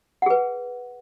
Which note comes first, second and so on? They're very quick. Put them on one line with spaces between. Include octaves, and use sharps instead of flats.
F#5 G#4 B4